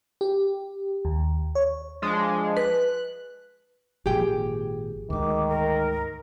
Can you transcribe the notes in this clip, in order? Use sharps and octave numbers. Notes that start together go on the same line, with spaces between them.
G4
D#2
C#5
F3 G#3 D4
B4 F#6
G#1 A#2 F3 G4 G#4 G5
D2 G#2 D#3 D6
A#4